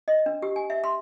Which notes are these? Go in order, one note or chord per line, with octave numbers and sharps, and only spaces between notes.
D#5
D4
G4
G#5
E5
C6